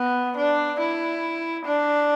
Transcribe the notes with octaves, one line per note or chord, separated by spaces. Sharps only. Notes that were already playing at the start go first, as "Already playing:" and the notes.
Already playing: B3
D4
E4
D4